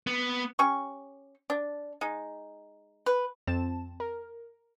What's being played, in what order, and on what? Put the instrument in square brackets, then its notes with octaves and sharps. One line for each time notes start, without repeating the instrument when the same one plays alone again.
[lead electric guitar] B3
[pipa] C#4 G4 C#6
D4
G#3 D#4
B4
[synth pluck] F2 C4 A5 E7
A#4